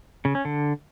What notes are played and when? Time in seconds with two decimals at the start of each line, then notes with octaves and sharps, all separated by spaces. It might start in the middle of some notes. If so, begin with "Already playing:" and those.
0.25 C#3
0.35 C#4
0.45 D3